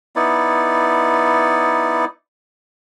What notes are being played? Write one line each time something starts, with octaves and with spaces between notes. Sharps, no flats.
B3 D#4 E4 D5